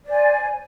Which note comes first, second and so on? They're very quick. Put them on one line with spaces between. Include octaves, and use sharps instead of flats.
D5 C5 G#5